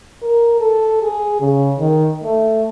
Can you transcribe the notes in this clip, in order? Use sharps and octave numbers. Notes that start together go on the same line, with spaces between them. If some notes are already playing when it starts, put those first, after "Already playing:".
A#4
A4
G#4
C#3
D#3
A3